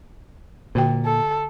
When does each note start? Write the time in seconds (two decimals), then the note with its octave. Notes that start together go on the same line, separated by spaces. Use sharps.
0.75 A#2 D3 F#4 G5
1.05 A4